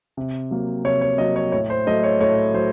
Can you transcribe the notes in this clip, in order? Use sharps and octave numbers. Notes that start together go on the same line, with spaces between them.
C3
F#3 A#3
C3 C#5
C#5
F#3 A#3 D#5
C#5
A2 C#5
C5
F#3 A3 D#5
C#5
A2 C#5
F#3 C5